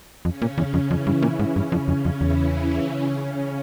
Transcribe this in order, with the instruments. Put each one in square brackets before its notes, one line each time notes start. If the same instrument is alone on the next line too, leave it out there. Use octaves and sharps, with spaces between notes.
[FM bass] F2 [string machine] C#3 C#4
[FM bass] A#2
E2
F2
[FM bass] F2 [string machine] E3 E4
[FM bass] G2
[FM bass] A#2 [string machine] C#3 C#4
[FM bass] G#2
[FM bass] G2 [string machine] C#3 C#4
[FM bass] F2
F2
F2
[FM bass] E2 [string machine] E3 E4
[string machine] C#3 C#4